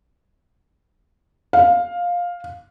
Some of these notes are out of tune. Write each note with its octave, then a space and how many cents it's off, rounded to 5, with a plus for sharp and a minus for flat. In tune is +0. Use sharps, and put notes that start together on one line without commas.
F5 +10